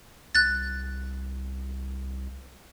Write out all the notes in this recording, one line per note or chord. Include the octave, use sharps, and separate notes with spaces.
C2 F#6 A6